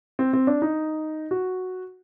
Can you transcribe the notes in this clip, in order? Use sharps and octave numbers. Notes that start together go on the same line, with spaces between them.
C4
C4
D4
D#4
F#4